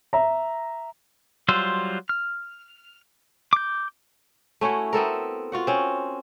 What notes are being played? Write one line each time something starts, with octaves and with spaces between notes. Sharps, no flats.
E5 A#5
F#3 G3 F4 C5 E6
F6
D6 G6
A3 C#4 E4 F#4
B3 C4 A4 A#4
F4 F#4 F#5
C4 C#4